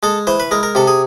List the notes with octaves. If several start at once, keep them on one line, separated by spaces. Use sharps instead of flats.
G#3 A4
E3 C5
B4
G#3 A#4
A#4
C3 A4
G#4